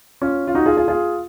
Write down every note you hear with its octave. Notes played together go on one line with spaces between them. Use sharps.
C#4 F4
F4
D#4 F#4
F4 G#4
F4 G#4
F4 G#4